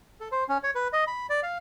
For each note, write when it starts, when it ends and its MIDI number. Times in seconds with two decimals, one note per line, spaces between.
0.20 0.28 69
0.32 0.44 72
0.49 0.58 61
0.63 0.71 73
0.75 0.88 71
0.93 1.04 75
1.07 1.27 83
1.30 1.40 74
1.43 1.58 77